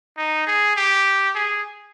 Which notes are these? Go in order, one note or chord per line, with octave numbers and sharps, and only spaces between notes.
D#4
G#4
G4
G#4